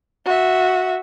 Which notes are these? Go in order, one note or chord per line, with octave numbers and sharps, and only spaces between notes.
F#4 E5